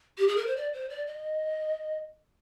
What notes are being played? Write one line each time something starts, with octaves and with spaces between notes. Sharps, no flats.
G4
G#4
A#4
C5
D5
C5
D5
D#5